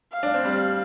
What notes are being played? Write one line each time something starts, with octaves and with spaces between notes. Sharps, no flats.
F5
D4
C4
G3 F5